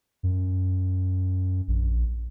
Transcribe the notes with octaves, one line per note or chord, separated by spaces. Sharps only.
F#2
A#1